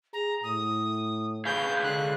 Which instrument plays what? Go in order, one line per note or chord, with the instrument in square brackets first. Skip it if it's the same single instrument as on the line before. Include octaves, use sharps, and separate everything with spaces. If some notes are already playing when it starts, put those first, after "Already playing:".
[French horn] G#4 [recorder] A#5
[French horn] A2 [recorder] D#6
[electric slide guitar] G#4 B4 F5 [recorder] G6
[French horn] D3 [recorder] F#6